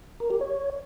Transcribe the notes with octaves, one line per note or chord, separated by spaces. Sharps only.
A#4
G4
C#5